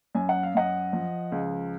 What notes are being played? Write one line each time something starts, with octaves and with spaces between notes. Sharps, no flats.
F#2 G#5
F#5
F5
F#2 D#5 F#5
F3
C#2